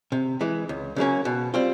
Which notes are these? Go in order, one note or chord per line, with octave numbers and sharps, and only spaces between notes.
C3
E3 G#3
C#2
C#3 F#3 A#3 C#4
B2
G3 C4 F4